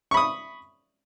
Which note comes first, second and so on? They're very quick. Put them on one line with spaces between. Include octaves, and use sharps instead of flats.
C#6 B5 D#6